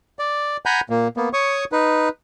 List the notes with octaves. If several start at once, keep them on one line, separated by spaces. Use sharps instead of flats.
D5
F#5 G#5 A#5 B5 G6
A#2 A#3
A#3 B3
C#5 C#6 D#6
D#4 B4